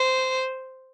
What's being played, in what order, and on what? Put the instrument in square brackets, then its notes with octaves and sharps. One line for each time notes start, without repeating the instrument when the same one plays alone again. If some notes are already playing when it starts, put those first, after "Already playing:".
Already playing: [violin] C5